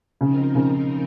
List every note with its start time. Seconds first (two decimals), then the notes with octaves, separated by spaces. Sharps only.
0.20 C#3 F3 C4 D#4 A#4
0.55 C#3